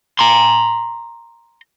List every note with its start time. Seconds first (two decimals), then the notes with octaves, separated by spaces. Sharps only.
0.19 A#5 C6